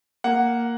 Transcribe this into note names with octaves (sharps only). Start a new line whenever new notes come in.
A#3 F#5